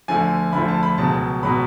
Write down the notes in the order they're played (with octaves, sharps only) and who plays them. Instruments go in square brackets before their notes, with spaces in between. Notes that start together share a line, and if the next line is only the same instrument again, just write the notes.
[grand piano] D2 D3 F3 G#5
D2 D3 F3 B5
A5
B5
C#2 B2 F#3 A5
B2 F#3 B5